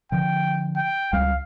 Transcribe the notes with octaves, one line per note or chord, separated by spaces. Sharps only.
D3 F3 G5
G5
C#2 G3 F5